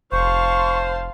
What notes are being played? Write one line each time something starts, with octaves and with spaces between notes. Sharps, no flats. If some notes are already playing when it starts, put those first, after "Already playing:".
F1 C5 F5 A5 C6 C#6